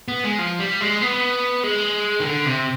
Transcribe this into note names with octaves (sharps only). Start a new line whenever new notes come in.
B3
G#3
F3
G3
G#3
B3
G#3
D#3
D3
C3